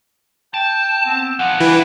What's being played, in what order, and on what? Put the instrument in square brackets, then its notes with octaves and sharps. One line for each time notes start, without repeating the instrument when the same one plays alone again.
[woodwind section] G5 [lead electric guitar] A5
[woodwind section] B3 C4
[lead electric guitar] E3 F3 [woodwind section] F#5
[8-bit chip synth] E3 [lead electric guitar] G3 D4